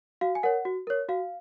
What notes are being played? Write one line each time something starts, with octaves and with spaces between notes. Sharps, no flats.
F#4 F5
G#5
A#4 C#5 F#5
F#4
A#4 C#5
F#4 F5